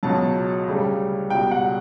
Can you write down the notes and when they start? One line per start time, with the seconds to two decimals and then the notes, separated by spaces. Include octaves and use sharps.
0.03 C#2 B2 F#3 A5
0.67 D2 C#3 G3
1.30 C#2 B2 G3 G5
1.51 F#5